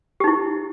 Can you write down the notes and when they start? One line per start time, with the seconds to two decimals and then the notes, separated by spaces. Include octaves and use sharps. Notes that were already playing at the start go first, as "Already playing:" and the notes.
0.20 G4
0.24 D#4
0.28 E4